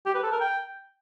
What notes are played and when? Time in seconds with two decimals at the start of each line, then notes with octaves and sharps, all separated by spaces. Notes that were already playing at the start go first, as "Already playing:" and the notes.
0.06 G4
0.14 B4
0.23 A4
0.32 A#4
0.41 G5